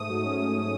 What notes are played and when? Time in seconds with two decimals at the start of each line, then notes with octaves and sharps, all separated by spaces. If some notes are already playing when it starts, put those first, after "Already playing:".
Already playing: G#2 A3 D#6
0.09 F#3
0.24 C#4